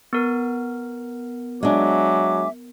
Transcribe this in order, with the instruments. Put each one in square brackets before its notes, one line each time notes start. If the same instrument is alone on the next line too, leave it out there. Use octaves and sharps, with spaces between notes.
[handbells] B3 A#4
[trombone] F#3 [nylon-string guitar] G#3 D4 [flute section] E5 G#5 D6